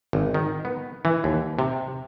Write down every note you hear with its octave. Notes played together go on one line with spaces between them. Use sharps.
G#1
D#3
B3
E3
D#2
C3